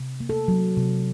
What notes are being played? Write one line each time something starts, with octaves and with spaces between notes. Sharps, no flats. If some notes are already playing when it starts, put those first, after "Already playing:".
Already playing: C3
A#3
A4
F#3
C3